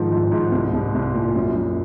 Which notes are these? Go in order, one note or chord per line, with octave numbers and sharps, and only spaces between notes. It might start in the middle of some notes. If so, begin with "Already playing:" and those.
Already playing: G#2 D#3 F3
G#2
G#2
C2
C2
C2
A#2
F#2
F#2